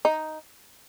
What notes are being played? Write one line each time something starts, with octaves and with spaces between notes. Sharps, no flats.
D#4